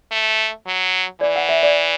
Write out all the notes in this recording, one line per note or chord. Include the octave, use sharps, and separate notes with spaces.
A3
F#3
E3 D5
F#5
E5
D5